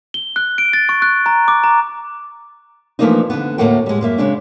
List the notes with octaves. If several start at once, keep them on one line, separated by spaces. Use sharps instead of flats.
G7
F#6
D7
A6
C#6
F#6
A#5
D6
A#5
E3 F3 A3 A#3 D4 D#4
D3 B3
D2 A2 A3 A#3 F#5 G5
G3 G#3
F#2 A#3 E5
C#3 G#3 D4